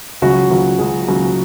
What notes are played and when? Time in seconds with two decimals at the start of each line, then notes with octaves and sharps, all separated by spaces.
0.22 C#2 C#3 F#3 F#4
0.50 C#2 C#3 F#3
0.79 C#2 C#3 F#3 G#4
1.07 C#2 C#3 F#3